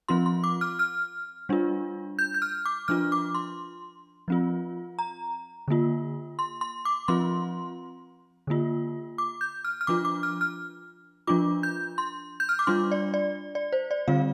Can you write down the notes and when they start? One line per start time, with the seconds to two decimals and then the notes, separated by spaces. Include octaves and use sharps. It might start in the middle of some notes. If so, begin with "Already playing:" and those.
0.08 F3 C4 F4 C6
0.26 C6
0.44 D6
0.61 F6
0.79 F6
1.49 G3 D4 F4
2.19 G6
2.34 G6
2.42 F6
2.65 D6
2.88 F3 D4 F4 F6
3.12 D6
3.35 C6
4.28 F3 C4 F4
4.99 A#5
5.68 D3 A#3 F4
6.39 C6
6.61 C6
6.85 D6
7.08 F3 C4 F4 C6
8.47 D3 A#3 F4
9.18 D6
9.41 G6
9.65 F6
9.81 F6
9.87 F3 D4 F4 D6
10.05 D6
10.23 F6
10.41 F6
11.27 F3 D4 F4 D6
11.63 G6
11.98 C6
12.40 G6
12.49 F6
12.59 D6
12.67 G3 D4 F4 C6
12.92 D5
13.14 D5
13.55 D5
13.72 C5
13.91 D5
14.08 D3 G3 C4 F4 F5